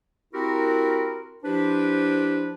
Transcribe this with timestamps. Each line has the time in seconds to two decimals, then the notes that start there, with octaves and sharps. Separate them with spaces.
0.34 C4 E4 F#4 G4 A#4
1.45 F3 D4 E4 G4 B4 C5